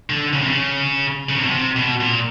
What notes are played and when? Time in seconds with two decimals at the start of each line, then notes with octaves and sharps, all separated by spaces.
0.10 D3
0.33 C#3
0.41 C3
0.48 C#3
1.29 C#3
1.36 C3
1.43 B2
1.51 C3
1.76 B2
2.01 A#2